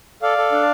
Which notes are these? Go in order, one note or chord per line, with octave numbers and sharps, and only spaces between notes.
A4 D5 F5
A4
D4